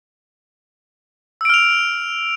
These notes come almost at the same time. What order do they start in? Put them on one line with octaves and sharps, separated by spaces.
E6 D7 F6 F7